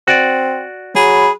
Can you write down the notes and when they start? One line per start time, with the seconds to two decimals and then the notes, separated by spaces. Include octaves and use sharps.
0.08 C4 F#4 D5
0.96 F#3 G#4 B5